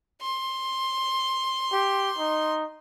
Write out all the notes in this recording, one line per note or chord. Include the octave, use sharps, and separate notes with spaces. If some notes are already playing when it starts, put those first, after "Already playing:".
C6
G4
D#4